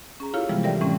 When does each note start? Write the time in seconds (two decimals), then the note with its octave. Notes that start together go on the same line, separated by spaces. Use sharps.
0.20 C#4 G#4 A#5
0.34 E4 F4 G4 A4 C#5 F5
0.49 C3 E3 F3 G3 G#3 B3
0.63 G4 A4 A#4 D5 E5 G5
0.81 A2 E3 G#3 A3 C4 C#4